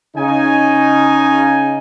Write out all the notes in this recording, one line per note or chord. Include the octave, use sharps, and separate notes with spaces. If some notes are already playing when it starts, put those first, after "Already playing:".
C#3 D#4 G#5